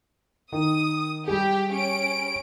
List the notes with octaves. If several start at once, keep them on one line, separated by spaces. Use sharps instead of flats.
D#3 D#6
G3 G4 G#4
C#4 D7